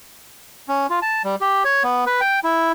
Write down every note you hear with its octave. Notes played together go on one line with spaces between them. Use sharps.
C#4
F4
A5
G3
G4
C#5
B3
B4
G5
E4